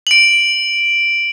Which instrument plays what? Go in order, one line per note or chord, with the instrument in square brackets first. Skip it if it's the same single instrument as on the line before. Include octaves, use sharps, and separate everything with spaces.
[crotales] D7 F#7